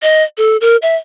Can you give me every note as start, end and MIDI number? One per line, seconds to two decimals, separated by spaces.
0.02 0.24 75
0.38 0.57 69
0.61 0.77 70
0.82 0.96 76